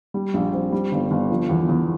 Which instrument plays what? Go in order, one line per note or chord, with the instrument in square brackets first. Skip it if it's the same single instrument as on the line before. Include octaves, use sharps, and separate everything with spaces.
[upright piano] G3
A#1
C4
G3
G1
G1
F3
E2
E2